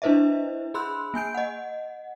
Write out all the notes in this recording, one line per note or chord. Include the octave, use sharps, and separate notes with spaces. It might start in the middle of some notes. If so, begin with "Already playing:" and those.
D4 E4 B4 C5 D#5 E5
G#4 B5 C6 E6 F#6
A#3 G#5 G6 D7
D#5 F#5